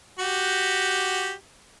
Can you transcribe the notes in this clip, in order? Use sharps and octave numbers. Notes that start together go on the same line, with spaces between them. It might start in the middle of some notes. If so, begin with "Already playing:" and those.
F#4 G4